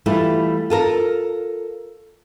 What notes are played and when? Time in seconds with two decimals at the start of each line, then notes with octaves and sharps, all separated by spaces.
0.06 E3 G3 A3 E4 F4 A4
0.70 F4 A4 A#4